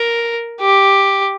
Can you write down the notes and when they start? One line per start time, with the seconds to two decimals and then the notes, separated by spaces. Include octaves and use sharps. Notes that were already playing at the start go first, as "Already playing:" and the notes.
Already playing: A#4
0.61 G4